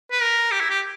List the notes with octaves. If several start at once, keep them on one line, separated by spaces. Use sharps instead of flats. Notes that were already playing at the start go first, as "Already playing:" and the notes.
B4
A#4
G4
E4
G4